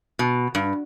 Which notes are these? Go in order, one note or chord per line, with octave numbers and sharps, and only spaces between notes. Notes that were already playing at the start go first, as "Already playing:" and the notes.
B2
G2